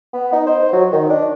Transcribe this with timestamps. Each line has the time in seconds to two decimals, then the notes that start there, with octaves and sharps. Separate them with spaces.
0.13 B3
0.32 D#4
0.46 C5
0.73 F#3
0.92 D#3
1.09 D4